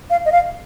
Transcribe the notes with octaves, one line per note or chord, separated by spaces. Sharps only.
F5
D#5
F5